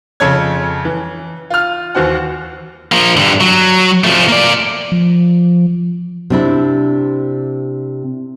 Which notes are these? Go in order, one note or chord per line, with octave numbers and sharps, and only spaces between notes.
F2 C#3 A4 C#5 G#6
E3
F4 F6
D#2 E3 F#4 C5 F#5
F3 A#3
G2 D3
F#3
F3 A3
A#3 D5
F3
C3 D4 E4